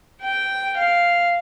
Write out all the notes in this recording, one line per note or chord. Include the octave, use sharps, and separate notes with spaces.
G5
F5